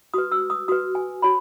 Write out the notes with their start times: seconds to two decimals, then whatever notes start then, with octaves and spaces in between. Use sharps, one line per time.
0.14 F#4 B4 D#6
0.32 E6
0.50 D#6
0.68 F#4 B4 D#6
0.95 G#5
1.22 F#4 C#5 B5